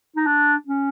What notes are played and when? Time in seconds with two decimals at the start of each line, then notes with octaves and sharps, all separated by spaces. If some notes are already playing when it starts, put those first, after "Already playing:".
0.16 D#4
0.26 D4
0.67 C#4